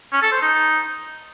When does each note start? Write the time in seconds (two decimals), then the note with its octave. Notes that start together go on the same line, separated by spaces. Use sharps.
0.12 C#4
0.22 A4
0.32 C5
0.42 D#4